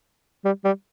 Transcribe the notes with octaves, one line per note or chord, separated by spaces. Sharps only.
G3
G3